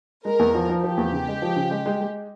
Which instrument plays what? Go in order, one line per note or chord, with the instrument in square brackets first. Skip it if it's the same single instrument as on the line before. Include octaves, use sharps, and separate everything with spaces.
[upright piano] G#3 [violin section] A#4
[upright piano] E2
F3
F3
[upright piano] F3 [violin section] G4
[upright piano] E2
C#3
G#3
F3
C#3
G#3
G#3
G#3